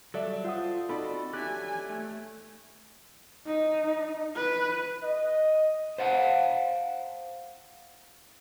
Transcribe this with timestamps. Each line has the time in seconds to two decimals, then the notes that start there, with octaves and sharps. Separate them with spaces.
0.14 F#3 G3 A4 D5 E5
0.44 F4 C5 F#5 D#6
0.89 C4 D#4 F4 F#4 A4 D5 B5
1.34 G4 C#5 E5 G#5 F#6
1.89 A3
3.46 D#4
4.36 B4
5.03 D#5
5.98 C5 F5 F#5 A5